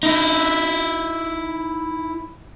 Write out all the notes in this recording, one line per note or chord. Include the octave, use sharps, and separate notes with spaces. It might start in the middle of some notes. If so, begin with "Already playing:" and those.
D#4 E4